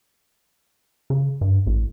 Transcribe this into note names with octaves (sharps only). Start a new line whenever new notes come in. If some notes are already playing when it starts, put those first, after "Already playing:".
C#3
G2
A1